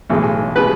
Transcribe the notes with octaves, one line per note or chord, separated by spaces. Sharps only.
B1 A2 E3 G#3
B2 G#3 B4